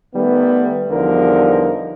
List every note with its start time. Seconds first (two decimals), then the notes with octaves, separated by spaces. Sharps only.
0.15 D#3 G3 A3 B3
0.91 E2 D3 F3 G3 D#4 A#4